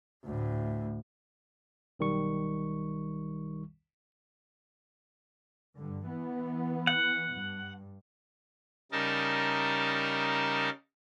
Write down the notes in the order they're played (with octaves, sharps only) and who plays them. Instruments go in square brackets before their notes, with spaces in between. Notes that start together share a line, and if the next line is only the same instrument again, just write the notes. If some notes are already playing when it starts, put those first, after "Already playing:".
[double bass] D2 A2
[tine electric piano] B1 D#3 G3 C#6
[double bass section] G2 D3
E3 B3
[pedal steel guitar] F#5
[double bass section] G2
[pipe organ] C#3 G3 D#4 A#4 A5